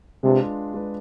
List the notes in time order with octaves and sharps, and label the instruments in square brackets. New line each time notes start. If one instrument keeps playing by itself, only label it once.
[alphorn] C3 [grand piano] G#3 D4 F4 B4
[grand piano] G#3 D4 F4 B4